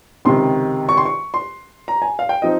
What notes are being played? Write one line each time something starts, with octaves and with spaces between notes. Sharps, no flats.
C#2 C3 D#3 C6
C#6
C6
C#6
C6
A#5
G#5
F5
G5
F3 C4 D#4 D#5